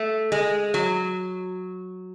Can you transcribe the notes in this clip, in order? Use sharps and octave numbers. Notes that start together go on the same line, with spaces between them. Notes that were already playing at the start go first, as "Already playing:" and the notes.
Already playing: A3
G#3
F#3